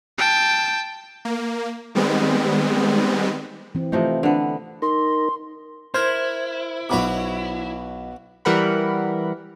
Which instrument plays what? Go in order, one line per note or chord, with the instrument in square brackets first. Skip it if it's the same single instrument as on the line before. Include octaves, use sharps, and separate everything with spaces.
[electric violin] G5 A5
[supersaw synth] A#3
D#3 G3 G#3 B3 C4
[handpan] E3 C4
[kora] C3 F3 D#4 [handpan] A3
[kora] D3 B3
[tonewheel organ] D#4 A#4 [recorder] C6
[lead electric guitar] E4 [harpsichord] A#4 [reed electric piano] C5 G#6
[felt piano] B1 B5 D6 [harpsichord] B2 F#4 C#5
[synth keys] E3 G3 A#4 F#5 B5